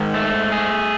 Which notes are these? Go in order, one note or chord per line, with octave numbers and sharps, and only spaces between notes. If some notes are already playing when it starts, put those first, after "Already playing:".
Already playing: G#2 D#3
A3
G#4